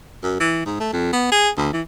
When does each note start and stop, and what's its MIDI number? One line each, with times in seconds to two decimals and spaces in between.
0.23 0.38 42
0.40 0.61 52
0.66 0.80 44
0.80 0.90 57
0.93 1.11 41
1.13 1.27 59
1.32 1.50 68
1.57 1.70 38
1.73 1.82 52